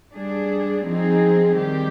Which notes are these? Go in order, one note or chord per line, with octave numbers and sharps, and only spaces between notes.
G3 D4 G#4
F3 C4 D#4 G#4
D#3 G3 C4 G4